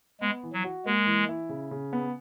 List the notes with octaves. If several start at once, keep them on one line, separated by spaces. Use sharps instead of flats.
G#3 B3
E3
F#3
F#4
G#3 A#3
E3
E4
C#3
C#3
B3